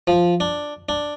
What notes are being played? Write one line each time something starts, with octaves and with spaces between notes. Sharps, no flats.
F3
D4
D4